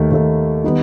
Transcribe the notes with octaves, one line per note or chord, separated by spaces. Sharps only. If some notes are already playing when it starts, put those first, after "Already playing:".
Already playing: D#2 D#3 A3
D#2 D#3 A3
D#3 G3 B3